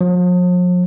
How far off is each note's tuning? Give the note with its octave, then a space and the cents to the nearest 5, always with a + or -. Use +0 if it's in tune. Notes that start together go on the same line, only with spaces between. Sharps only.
F3 +45